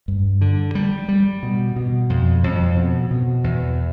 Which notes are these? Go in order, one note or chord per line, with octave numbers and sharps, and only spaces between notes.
G2
D3
G3
G3
B2
B2
F2
F2
B2
B2
E2